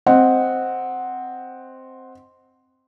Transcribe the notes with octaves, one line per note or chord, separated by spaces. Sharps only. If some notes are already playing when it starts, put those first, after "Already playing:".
C4 D#5 F#5